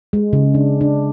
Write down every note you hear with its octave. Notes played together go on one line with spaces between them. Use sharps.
G#3
C#3
D4
D4